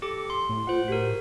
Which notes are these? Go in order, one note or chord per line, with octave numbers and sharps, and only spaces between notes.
G4 A4 D6
C6
A2
F4 C5 F#5
F#4 G4 A#4